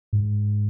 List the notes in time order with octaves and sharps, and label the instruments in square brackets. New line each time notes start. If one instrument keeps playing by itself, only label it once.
[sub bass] G#2